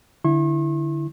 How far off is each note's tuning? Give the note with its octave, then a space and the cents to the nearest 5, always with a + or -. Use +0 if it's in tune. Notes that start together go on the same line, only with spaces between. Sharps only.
D3 +0 E4 +0 C#6 -45